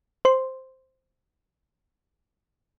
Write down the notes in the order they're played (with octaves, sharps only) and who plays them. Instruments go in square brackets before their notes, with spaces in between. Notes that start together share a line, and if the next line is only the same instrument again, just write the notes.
[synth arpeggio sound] C5 C6